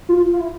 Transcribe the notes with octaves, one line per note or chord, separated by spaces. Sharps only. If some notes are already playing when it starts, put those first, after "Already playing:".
F4
F4
E4